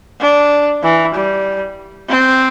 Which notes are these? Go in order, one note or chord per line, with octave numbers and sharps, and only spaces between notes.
D4
E3
G3
C4